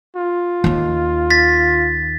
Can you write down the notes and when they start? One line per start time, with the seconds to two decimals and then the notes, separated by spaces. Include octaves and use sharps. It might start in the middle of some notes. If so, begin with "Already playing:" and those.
0.16 F4
0.64 D#2 D#3
1.30 A6 B6